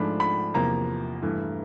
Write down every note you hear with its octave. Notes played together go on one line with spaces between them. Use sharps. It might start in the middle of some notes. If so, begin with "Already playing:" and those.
Already playing: G#2 F3 A3 D4 B5
B5
E2 C3 F3 A#3 A#5
G2 E3 A3